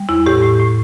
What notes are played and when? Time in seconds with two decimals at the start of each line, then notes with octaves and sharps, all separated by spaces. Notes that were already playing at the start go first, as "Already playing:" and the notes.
Already playing: G3
0.09 E2 E4
0.26 A2 G4
0.43 A2
0.60 A2